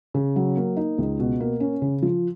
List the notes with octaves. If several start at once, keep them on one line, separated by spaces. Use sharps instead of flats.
C#3
F#3
A#3
D#4
C#2
B2
A#3
C#4
C#3
F3